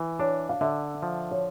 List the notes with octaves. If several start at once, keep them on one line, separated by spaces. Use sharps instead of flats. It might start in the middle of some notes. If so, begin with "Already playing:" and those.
Already playing: E3
D4 C#5
F5
D3 E5
F3
C#5